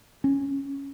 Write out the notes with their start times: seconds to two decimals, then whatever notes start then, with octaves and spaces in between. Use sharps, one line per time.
0.24 C#4